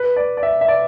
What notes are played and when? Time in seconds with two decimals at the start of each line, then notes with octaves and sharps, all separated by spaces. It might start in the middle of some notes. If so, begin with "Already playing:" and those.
Already playing: B4
0.16 D5
0.37 D5
0.43 E5
0.61 E5
0.68 D5